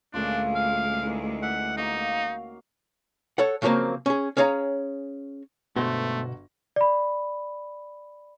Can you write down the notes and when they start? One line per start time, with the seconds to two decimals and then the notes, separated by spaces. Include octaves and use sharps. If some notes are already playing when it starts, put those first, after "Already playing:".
0.14 D2 A#2 G#3 C#4 D4 F4
0.55 F5
1.02 D#3 E3
1.43 E5 F#5
1.77 A#3 D#4 F#4 F5
3.38 A4 C#5 F#5
3.62 C#3 F3 F#3 A3 A#3 C4
4.06 C#4 G#4
4.37 C#4 G#4 C#5 F5 A5 A#5
5.76 G1 G#2 B2 A3 B3 F#4 C5 A#6
6.76 D5 B5